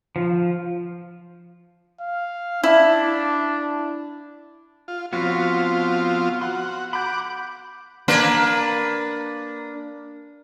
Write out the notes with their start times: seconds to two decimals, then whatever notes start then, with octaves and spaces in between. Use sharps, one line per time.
0.16 F3
2.01 F5
2.64 D4 E4
4.88 F4
5.13 F3 B3 C4 F4 F#4 C#5
6.41 F#4 C6
6.93 F#5 B5 D6 G6
8.08 A#3 D4 B4